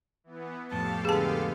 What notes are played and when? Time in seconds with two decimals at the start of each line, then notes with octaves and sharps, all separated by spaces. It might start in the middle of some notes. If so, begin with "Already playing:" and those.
0.24 E3 B3
0.72 F2 A2 G4 A4 F5 A5
1.05 D3 G#3 B3 G#4 A5